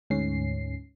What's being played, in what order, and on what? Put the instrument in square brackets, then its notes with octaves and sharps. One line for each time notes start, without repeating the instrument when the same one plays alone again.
[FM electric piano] D2 G#2 C#4 C7